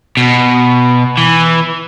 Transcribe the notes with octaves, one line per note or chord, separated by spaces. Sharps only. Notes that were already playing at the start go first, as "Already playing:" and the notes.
B2
E3